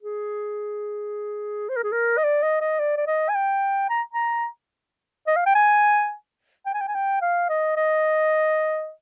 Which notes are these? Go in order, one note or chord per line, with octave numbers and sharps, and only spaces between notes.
G#4
C5
A#4
G#4
A#4
D#5
D5
D#5
D#5
D5
D5
D#5
G#5
G5
A#5
A#5
D#5
F5
G5
G#5
G5
G#5
G5
G#5
G5
F5
D#5
D#5